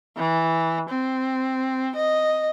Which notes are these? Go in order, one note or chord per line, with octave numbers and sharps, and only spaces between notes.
E3
C4
D#5